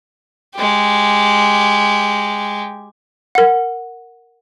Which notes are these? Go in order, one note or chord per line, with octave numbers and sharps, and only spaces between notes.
G#3 G4
A#4 F#5